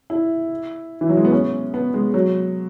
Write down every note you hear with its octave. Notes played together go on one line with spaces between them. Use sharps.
E4
E3
F#3
G#3
B3
C#4
B3
G#3
F#3